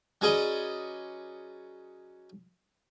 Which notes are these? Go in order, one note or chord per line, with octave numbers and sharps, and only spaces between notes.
F#3 C#4 G#4 B4 D5 D#5